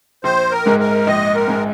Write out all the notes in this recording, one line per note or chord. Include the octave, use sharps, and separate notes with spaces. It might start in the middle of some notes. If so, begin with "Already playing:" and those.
A#1 C5
A#4
G#2 G#3
A#4
A#1 D#5
A#4
G#2 G#3